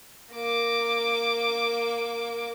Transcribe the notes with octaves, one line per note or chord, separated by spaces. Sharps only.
A#3 D6